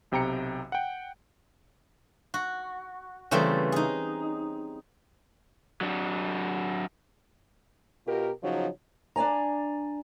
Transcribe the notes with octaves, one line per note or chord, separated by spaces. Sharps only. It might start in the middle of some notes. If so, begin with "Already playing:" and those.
B1 C3 G5 A#5 C#7
F#5 G5
F#4
C#3 E3 G3 A3 C4
D#4 G#4
F#3 D4
B2 F4 G4 A#4
C#3 F3 F#3 D#4 C#5
D4 D5 G#5 A#5